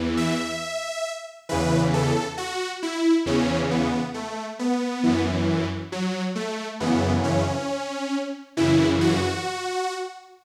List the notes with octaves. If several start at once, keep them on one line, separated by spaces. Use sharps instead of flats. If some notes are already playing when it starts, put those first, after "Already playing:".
Already playing: E2 E3
E5
E2 C#3 E3 B4
A4
F#4
E4
E2 C#3 E3 C#4
B3
A3
B3
F#2 E3
F#3
A3
F#2 C#3 E3 B3
C#4
F#2 C#3 E3 E4
F#4